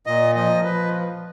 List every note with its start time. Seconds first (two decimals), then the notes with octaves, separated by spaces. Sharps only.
0.06 A#2 D#5
0.35 F3 D#5
0.63 F3 B4